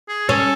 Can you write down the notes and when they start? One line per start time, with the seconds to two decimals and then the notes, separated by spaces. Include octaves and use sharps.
0.08 G#4
0.29 C#4 A4